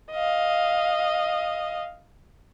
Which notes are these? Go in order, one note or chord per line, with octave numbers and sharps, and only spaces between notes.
D#5 F5